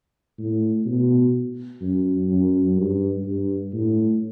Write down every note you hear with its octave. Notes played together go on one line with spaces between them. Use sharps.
A2
B2
F#2
F#2
G2
G2
A2